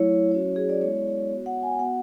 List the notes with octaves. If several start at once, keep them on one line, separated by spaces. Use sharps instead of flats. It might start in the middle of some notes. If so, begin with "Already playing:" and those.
Already playing: F#3 A3 E4 C#5
F#3 C#4 F#4 C#5
G#4
D5
G#3 B3 E4 C#5
B3 F#4
F#5
G#5
B3 F#4 F#5